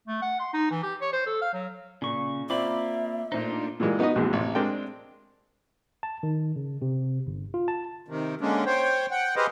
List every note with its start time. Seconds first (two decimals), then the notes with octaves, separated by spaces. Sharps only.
0.08 A3
0.22 F#5
0.40 C6
0.54 D#4
0.71 E3
0.83 G4
1.01 C#5
1.13 C5
1.26 A4
1.42 F5
1.53 F#3
2.02 A#2 C#3 C#6
2.50 A#3 C4 F4 D5 E5 B5 D6
3.32 A#2 A3 A#3 D4 D#4 F4 C5
3.80 A#2 E3 G3 G#3 A#3
3.99 B3 D#4 F#4 B4 D#5
4.15 A#1 D#2 C3 E3 F#3 G#3
4.33 A1 C3
4.55 G#3 C4 D4 A#4 D5 G5
6.03 A5
6.23 D#3
6.56 C#3
6.82 C3
7.27 G1
7.54 F4
7.68 A5
8.08 C3 D#3
8.41 D3 G#3 A#3 C#4 D4
8.66 C5 C#5 G5
9.11 F#5 G5
9.36 G4 G#4 B4 C5 D#5 F5